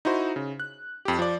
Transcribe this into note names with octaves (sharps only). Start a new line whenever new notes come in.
D#4 E4 F#4 C5
C#3
F#6
F2 G4
F3 D5